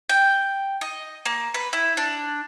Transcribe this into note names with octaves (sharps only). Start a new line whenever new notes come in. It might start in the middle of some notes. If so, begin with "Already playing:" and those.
G5
D#5
A#3
B4
E4
D4